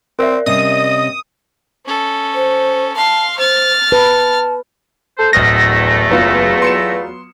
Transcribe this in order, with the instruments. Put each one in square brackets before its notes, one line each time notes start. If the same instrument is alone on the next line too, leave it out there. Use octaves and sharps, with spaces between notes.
[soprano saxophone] C4 [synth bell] A#4 D5 E5
[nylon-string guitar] C3 G3 C#4 [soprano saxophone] D#5 [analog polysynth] D#6
[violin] C#4 A4
[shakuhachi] C5
[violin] F5 C6 [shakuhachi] A5
[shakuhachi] C5 [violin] F6 A6
[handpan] B4 [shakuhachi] A5
[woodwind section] A4 C5
[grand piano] D1 D#6 F6 [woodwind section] E2 A3 [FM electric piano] A#6
[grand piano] F#1 [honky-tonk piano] F#3 B3 F4
[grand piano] C6 C#7 E7